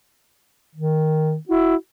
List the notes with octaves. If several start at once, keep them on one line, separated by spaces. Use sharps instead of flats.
D#3
E4 F#4